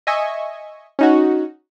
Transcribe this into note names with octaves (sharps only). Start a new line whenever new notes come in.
D#5 E5 G#5 C#6
C#4 D#4 F#4